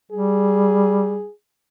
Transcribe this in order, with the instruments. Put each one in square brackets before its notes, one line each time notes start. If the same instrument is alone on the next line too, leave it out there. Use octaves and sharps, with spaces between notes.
[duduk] G3 [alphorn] G#4